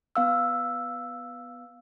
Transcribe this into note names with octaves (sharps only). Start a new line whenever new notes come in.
B3 F5 E6